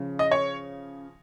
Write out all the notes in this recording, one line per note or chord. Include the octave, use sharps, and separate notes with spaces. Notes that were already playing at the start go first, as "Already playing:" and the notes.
Already playing: C#3 F3
D#5
C#5